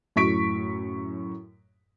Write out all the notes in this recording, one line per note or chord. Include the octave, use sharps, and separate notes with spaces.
F#2 A2 C#6 B6 D7